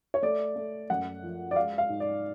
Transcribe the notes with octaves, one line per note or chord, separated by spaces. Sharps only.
C#5
A3 D5
A3
F#2 F#5
F3
D5
G#3 F5
F5
G#2
D5